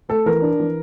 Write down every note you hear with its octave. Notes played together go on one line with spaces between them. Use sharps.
A3 A4
E3 A#4
D4
E3